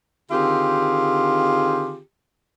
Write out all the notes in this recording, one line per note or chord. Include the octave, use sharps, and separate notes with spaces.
D3 D#3 C4 F4 G4 G#4